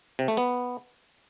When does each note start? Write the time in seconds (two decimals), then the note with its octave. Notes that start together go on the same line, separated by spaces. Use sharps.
0.19 C3
0.28 A3
0.37 B3